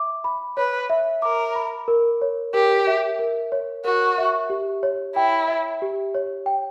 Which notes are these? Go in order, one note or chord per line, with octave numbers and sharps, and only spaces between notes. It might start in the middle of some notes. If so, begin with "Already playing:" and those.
Already playing: E5 D6
B5
B4 C#5
E5
A#4 D6
B5
A#4
C#5
G4 A#4
E5
A#4
C#5
F#4 A#4
E5
G4
C#5
E4 G5
E5
G4
C#5
G5